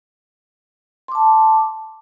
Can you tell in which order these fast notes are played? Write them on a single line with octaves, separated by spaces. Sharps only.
C6 D6 A5